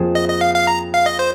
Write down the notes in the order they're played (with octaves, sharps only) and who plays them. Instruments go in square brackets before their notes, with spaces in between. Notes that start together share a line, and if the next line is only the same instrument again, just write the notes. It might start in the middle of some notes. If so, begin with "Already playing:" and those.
Already playing: [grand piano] F2 F3 A#3 G#4
[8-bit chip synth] D#5
D#5
F5
F5
A#5
F5
D#5
C5